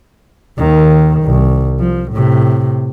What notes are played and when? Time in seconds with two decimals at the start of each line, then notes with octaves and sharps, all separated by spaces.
0.58 D#2 D#3
1.24 C2
1.79 F3
2.12 A2 C3